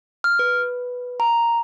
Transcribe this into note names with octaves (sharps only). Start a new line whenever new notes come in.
F6
B4
A#5